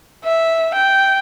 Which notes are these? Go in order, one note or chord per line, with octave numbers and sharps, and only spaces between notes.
E5
G5